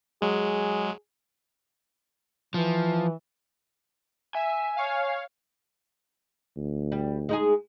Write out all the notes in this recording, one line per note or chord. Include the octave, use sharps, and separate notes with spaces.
F#3 G#3 G#4
E3 F3
E5 G#5
C#5 F5
D2
G3
G#3 D#4 G#4